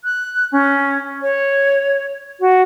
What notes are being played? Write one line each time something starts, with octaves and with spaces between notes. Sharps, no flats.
F#6
C#4
C#5
F#4